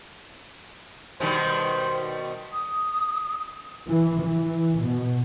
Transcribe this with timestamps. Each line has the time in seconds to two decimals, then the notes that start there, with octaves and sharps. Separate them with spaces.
1.20 B2 D#3 G3 C5
2.53 D#6
3.87 E3
4.20 E3
4.81 B2